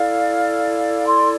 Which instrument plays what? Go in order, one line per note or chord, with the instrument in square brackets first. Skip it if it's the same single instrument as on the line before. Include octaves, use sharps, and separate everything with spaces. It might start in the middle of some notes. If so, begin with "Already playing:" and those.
Already playing: [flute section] E4 A4 D5 [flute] F5
[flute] C6